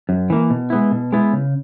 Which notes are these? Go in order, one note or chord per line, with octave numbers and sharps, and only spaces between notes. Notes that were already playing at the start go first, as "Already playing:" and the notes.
F#2
E3 A#3
B2
G#3 B3 E4
B2
G#3 B3 E4
C#3